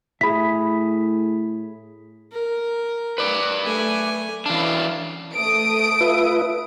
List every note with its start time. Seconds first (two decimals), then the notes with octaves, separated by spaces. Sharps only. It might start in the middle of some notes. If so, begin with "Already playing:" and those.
0.21 A2 G#4 E5 B5 B6
2.32 A#4
3.18 B4 D5
3.64 A3 G#5
4.46 E3 C#4 D4 F5
5.35 A3 D#6 D7
6.01 F4 B4 E5